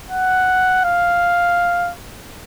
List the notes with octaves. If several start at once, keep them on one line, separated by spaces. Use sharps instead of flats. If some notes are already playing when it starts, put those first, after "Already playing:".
F#5
F5